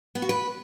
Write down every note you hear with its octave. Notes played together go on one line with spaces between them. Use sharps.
B3
F#4
B4